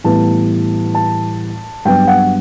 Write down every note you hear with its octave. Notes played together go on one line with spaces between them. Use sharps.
A2 E3 G3 B3 A5
A5
G2 F#3 B3 G5
F#5